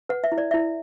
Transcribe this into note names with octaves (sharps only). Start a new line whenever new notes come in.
B4 F#5
E5
E4
D5
E4 E5